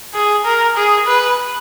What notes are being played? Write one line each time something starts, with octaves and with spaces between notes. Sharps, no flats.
G#4
A#4
G#4
B4